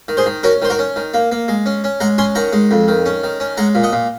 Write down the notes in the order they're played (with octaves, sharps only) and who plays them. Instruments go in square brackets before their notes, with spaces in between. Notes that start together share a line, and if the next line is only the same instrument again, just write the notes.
[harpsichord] D#3
G#4 C5
D#3
C#4 F#4 A#4
D#3 C5
F#4 A#4
C#4
D#3
A#3
A#3
G#3
C#4
C#4
G#3 F#5 A#5
C#4 G#5 C6
D#3 F#5 A#5
G#3
F2
D#3
C#4
D#3
C#4
G#3 F#5 A#5
A#2
D#5 F#5
A#2